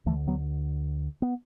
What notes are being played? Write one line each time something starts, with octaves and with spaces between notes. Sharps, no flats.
D2 D3 E3 A3
F#3 B3
B3